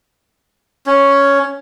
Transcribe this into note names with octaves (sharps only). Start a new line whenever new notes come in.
C#4